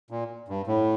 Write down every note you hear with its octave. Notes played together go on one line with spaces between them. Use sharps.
A#2
G2
A2